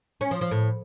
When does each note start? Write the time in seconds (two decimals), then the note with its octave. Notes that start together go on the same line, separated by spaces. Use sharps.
0.21 C#4
0.31 F3
0.41 F3
0.51 A2